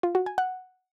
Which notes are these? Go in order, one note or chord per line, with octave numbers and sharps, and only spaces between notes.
F4
F#4
G#5
F#5